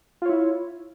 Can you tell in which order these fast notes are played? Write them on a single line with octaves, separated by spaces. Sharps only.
F4 C#5 E4